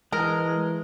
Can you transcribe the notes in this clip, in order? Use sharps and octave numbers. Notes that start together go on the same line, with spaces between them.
E3 G#3 A#4